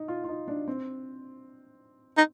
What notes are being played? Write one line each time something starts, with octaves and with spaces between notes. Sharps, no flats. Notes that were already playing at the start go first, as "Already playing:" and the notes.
Already playing: D#4
F4
F4
D#4
D4
C4
D#4